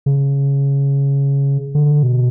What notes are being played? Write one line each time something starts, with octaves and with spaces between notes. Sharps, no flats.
C#3
D3
B2